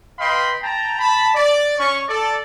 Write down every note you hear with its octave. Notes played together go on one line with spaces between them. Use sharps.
B4 D#5 F5 G5 B5 C6
G5 A5 A#5
A5 B5
D5
C#4 C#6
A4 D5